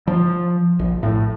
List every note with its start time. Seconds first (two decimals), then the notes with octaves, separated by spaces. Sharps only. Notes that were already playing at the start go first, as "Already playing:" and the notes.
0.07 F3
0.79 A#1
1.03 A2